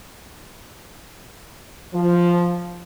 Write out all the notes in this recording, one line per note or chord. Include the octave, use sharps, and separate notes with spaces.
F3